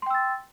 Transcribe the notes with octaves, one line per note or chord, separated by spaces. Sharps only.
G5 C6 E6 A6